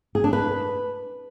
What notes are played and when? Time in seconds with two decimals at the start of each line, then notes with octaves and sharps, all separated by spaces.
0.15 G#4
0.24 D4
0.33 B4